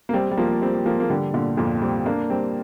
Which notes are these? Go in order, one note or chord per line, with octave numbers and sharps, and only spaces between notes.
A#3
G3 C4
G3
F3 A#3
G3 C4
F3 A#3
A#3
D3 G3
A#2 D3
F2 A#2
G3 C4
A#3 D4
G3 C4